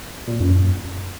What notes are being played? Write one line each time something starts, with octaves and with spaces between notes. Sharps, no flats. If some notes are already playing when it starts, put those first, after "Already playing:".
A#2
F#2